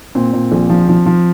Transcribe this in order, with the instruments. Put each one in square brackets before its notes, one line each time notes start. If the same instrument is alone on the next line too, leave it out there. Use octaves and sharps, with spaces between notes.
[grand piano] A#2 C4
A#2
A#1
F3
F3
F3